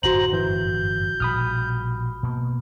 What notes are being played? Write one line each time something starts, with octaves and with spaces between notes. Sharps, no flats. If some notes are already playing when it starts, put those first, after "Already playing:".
G1 F#2 A2 F#4 C5 A#5 F#7
E3 G6
A#1 B2 G3 B5 D#6 F6
B2 A#3